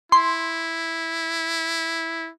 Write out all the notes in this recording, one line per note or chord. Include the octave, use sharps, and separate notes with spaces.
E4 C6